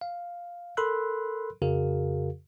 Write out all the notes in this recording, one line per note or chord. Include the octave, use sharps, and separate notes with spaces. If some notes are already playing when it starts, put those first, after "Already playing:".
F5
A4 A#4 B5 C6 E6 F#6
F2 C#3 F#4 G#4 A#4 F5